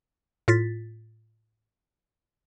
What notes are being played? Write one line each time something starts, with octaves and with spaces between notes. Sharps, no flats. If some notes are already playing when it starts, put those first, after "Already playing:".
A2 F4 A6 B6